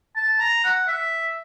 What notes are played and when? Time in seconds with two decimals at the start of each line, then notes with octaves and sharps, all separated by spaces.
0.16 A5
0.39 A#5
0.64 F#5
0.88 E5